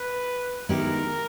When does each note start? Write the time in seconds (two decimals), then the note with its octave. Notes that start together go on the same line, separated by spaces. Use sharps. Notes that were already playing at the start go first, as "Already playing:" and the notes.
Already playing: B4
0.69 D#3 G#3 B3 E4 G4 A#4